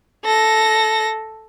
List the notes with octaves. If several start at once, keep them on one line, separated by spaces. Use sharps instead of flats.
A4 A#6